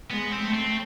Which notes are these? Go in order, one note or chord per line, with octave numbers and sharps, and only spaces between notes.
G#3 B3
C4
A3
C4